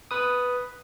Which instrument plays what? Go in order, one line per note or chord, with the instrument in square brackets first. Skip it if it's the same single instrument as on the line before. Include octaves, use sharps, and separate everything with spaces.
[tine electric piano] B4 D#6